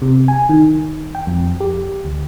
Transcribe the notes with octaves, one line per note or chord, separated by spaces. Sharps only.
C3
G#5
D#3
G5
F2
G4
D2